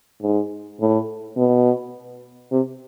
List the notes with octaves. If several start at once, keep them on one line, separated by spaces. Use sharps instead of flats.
G#2
A2
B2
C3